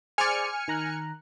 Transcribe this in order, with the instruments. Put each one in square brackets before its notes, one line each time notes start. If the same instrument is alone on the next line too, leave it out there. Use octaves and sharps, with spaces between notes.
[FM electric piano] G#4 C5 D5 [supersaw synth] G#5 F6 C#7
[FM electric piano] D#3 A#5 F#6